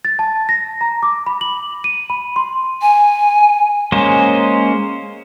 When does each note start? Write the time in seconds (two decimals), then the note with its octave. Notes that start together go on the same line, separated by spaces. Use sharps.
0.05 A6
0.19 A5
0.49 A#6
0.81 A#5
1.03 D6
1.26 B5
1.41 F#7
1.84 D#7
2.10 B5
2.36 C6
2.82 G#5
3.92 G#3 A#3 C#4 C5